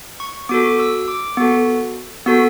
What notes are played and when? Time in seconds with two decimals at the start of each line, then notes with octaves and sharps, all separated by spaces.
0.20 C#6
0.49 B3 F#4 A4 D6
0.80 E6
1.08 D6
1.37 B3 F#4 A4
2.26 B3 F#4 A4 E6